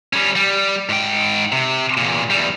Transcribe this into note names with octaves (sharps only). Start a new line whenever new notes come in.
G3 C#4
G3
G#2 G5
C3
E2 A#2
E2 G3